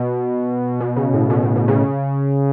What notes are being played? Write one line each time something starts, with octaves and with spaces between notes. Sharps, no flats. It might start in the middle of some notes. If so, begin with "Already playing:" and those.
Already playing: B2
B2
C#3
A2
B2
B2
B2
C#3